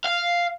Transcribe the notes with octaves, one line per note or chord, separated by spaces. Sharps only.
F5